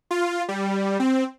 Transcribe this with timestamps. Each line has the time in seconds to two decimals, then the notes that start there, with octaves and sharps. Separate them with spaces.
0.11 F4
0.48 G3
1.00 C4